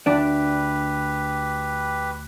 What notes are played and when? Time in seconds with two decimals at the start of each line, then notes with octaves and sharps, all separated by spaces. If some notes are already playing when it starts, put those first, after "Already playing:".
0.06 D2 D4 G4 B4 D5